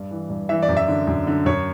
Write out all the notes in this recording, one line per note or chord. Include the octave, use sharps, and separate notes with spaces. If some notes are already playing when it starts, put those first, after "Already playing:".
Already playing: G2
E3
G2
E3 E5
D5
F#2
E5
D3
F#2
D3
F#2 C#5